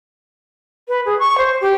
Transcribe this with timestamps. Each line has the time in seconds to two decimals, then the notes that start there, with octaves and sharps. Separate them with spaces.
0.88 B4
1.05 G#4
1.19 C#6
1.38 C5
1.61 G4